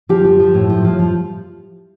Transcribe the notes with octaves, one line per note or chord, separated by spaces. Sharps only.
F3 G4
F3
F3
A2
F3
F3
F3